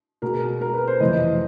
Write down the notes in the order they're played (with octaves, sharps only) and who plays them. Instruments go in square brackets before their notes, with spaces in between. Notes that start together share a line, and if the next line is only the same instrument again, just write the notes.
[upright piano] B2 G#3 B3 A#4
A#4
B4
C5
F2 C3 E3 D#5